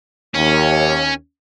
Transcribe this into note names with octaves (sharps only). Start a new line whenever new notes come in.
D#2 C#4